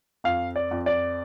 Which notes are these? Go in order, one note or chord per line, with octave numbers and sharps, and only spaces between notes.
F2 F5
D5
F2
D5